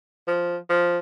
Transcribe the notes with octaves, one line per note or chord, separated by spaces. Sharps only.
F3
F3